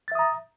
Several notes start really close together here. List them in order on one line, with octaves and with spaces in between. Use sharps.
A6 E5 D#6 A#5